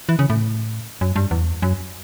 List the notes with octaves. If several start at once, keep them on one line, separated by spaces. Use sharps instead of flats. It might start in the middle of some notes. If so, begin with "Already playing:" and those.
E3
C#3
A2
F#2
G2
E2
F#2